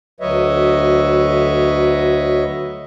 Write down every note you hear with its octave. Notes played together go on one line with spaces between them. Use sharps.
D2 F#3 B4 C#5 D#5 E5